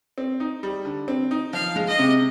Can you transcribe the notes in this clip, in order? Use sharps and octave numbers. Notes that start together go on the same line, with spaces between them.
C4
D#4
G3
D3
C4
D#4
F3 F5
G#3
D#5
C3